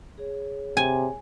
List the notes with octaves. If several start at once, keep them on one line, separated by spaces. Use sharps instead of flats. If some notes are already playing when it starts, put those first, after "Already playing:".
G#4 C#5
C3 G#5